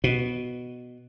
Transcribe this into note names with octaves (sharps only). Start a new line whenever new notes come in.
B2